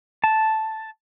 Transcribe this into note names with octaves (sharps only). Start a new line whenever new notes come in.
A5